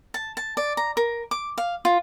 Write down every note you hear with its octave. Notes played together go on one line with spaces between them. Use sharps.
A5
A5
D5
A#5
A#4
D6
F5
F4